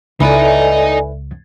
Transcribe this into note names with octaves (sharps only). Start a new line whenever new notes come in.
C#2 D#4 E4 A4 B4 D5 D#5 G#5